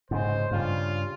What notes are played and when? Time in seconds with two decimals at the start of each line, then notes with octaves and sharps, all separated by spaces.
0.11 G#2 C#3 C5
0.51 G2 C#3 F4